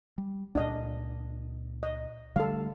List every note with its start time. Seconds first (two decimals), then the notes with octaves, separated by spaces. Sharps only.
0.18 G3
0.55 C#2 A#2 D4 D#5
1.83 D#5
2.36 D3 G3 A3 A4 F5